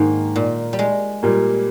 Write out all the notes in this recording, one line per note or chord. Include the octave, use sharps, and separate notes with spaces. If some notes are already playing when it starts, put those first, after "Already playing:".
Already playing: G#2 D#3 A#3
A#2
G3
G#3
A#2 G3 A#3